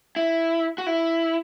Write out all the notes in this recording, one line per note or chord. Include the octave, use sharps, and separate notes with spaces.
E4
F#4
E4